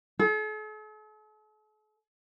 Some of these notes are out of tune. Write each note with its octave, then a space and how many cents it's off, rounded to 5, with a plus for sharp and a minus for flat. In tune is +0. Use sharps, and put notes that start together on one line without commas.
A4 -45